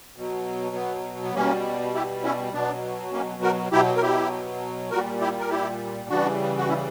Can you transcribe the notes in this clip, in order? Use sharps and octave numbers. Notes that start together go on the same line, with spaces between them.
B2 F#3
B3
B3
B2 G3 A#3 C#4
E4 G4
C#4 E4
B2 F#3 B3 D4
A#3 C#4
F#4 A#4
B2 F#3 E4 G4
A#4
E4 G4
A#2 G3 F#4 A#4
E4 G4
A#4
E4 G4
C#3 E3 G3 D4 F#4
F#4
C#4 E4